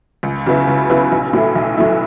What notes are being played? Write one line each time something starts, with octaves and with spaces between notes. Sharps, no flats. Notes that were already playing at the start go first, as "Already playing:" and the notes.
C#2
C#3 F#3 B3 E4
C#2
C#3 F#3 B3 E4
B1
A2 F#3 A3 E4
B1
A2 F#3 A3 E4